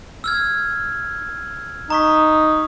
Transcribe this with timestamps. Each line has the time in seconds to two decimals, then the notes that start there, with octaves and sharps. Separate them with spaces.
0.24 E6 F6 G#6
1.90 D#4 A#5 C#6 B6